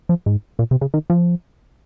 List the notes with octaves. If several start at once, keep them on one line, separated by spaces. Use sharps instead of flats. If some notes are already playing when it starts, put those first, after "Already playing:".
F3
G#2
A#2
C3
C#3
D#3
F3